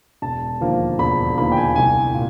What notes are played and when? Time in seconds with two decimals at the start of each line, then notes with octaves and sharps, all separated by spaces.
0.22 E1 A5
0.61 D#2 D3 F3 A#3
0.99 E1 B5
1.38 D#2 D3 F3 A#3 B5
1.52 G5
1.57 G#5
1.76 C2 G#5
2.14 A#2